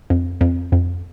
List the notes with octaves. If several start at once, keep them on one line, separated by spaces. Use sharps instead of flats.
F2
F2
F2